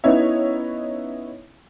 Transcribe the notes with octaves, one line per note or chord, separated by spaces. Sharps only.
B3 C#4 D#4 E4 C#5 E5